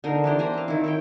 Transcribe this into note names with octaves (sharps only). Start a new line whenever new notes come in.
D3 D#4 A#4 C5
E3 D4 G4 C5
C5 G#5 A#5 B5
C4 F5
D#3 E4
E4 C#5 G5